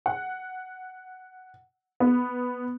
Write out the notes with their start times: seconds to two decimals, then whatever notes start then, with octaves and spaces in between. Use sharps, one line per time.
0.06 F#5
2.00 B3